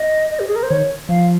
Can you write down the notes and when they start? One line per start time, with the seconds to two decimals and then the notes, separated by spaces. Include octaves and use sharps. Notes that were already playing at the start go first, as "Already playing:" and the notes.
Already playing: D#5
0.31 D#5
0.40 G4
0.48 G#4
0.55 A#4
0.63 C5
0.70 D#3 C#5
1.09 F3 F5